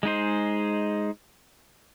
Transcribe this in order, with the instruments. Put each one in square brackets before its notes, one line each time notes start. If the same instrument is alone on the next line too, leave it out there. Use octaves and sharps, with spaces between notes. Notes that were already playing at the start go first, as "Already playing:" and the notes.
[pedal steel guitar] G#3 D#4 G#4 C5